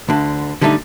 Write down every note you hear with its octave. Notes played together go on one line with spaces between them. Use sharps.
D2 D3
D3 G3 A3 B3 D#4